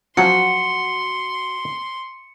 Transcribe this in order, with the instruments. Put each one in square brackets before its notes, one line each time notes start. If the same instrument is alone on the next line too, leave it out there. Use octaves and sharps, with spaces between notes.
[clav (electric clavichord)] F3 F#3 C#4 [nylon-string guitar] F#4 [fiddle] C6 [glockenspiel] C#7